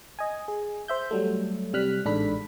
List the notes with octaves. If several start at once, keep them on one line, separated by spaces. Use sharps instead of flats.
D#5 G#5
G#4
C5 E5 G6
F#3 G3 A3
C3 G3 F6 F#6 B6
A1 G#2 D4 A4 B5 B6